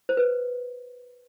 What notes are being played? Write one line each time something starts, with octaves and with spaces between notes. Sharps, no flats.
C5
B4